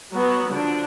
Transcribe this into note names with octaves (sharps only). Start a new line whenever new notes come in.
F#3 B3 F#4
D3 F3 D4